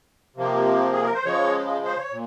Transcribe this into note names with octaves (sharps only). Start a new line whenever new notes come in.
C3 F3 A#3
G#4
A#4
C5
C#3 F3 G#3 C#5
C5
C#5
A#2